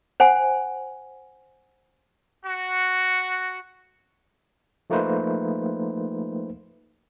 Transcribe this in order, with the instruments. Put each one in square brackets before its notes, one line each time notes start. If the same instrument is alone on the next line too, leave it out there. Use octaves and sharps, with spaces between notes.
[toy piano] C5 F#5 G#5
[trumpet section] F#4
[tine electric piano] F3 A3 A#3 D#4 B4 C5